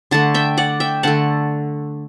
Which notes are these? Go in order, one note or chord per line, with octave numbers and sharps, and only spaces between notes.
D3 A3 F#5 A5
E5 G5
D5 F#5
E5 G5
D3 A3 F#5 A5